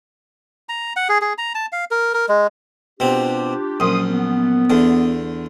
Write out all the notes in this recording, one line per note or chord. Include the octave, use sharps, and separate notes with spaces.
A#5
F#5
G#4
G#4
A#5
A5
F5
A#4
A#4
G#3
B2 C4 D4 F4 G4
A#1 F#2 C6 D#6
B3
E2 D3